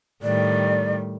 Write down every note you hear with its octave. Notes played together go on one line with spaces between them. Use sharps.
A2 D#3 G3 D5